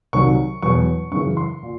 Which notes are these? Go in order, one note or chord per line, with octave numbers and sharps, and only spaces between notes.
C2 C3 D#3 F#3 C#6
E2 B2 F#3 C#6
F#2 C#3 E3 C#6
C6
A#2